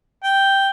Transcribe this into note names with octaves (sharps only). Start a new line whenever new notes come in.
G5